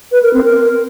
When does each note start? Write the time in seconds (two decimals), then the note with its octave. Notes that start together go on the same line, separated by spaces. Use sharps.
0.12 B4
0.23 A#4
0.33 C4
0.44 A#4